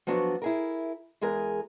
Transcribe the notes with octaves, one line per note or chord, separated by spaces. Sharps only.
F3 F#3 B3 D4 F#4
E4 G#4 A#4
E2 G#3 G#4 A#4 G#5